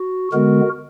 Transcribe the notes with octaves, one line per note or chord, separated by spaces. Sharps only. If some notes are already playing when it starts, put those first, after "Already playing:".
Already playing: F#4
D3 G#3 B3 F#4 A#4